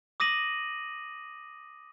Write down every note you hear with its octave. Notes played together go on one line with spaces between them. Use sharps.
D6 D#6 A#6 D#7 F#7